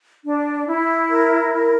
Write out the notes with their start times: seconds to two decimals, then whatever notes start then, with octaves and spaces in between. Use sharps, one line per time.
0.24 D4
0.67 E4
1.09 A#4
1.52 A#4